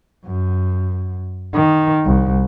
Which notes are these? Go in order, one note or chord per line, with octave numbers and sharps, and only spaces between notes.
F#2
D#3
C2